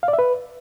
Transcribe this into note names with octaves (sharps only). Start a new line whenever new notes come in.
F5
D5
E5
B4